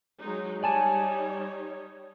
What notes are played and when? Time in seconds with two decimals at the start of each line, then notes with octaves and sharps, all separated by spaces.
0.20 F#3 G#3 D#4
0.63 G3 D#4 C#5 D5 G#5 A5